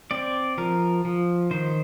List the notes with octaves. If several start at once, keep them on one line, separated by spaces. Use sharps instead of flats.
C4 D5
F3 A#4
F3
D#3 C5